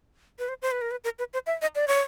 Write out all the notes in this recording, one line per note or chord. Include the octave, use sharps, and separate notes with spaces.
B4
C5
C5
B4
A#4
B4
A#4
B4
C5
E5
D#5
D5
C#5